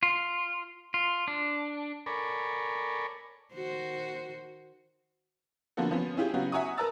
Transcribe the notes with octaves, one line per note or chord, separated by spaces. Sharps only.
F4
F4
D4
A4 A#4 C#5 D5 G#5 B5
D#3 F#4 C5
D3 F3 A#3 B3 F#4 A4
F3 B3 C#4
C#4 E4 F4 G4 G#4
C#3 F#3 B3 F#4 G4 F5
E5 F#5 G#5 A#5 C#6 D#6
A#4 B4 A5 A#5 E6 A6